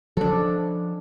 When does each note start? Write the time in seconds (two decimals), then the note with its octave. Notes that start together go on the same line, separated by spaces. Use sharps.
0.17 F3 C#4 D4 A4